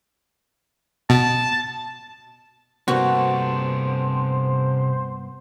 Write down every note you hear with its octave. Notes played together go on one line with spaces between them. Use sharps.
B2 A5
G2 C3 A#3 B3 F#4 A4 C5